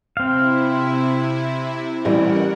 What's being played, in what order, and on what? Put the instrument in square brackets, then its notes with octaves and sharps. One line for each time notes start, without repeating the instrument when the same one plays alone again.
[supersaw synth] C3 E4 [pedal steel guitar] C4 F5
[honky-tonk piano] A1 E3 G3 [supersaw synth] A#4 F#5